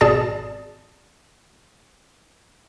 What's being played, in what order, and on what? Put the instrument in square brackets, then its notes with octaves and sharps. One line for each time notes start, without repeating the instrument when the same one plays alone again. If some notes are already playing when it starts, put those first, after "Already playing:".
[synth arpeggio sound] G#1 B2 G#4 D5 A5 A6